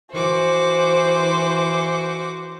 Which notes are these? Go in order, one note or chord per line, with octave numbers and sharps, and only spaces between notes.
E3 F#4 C5 D6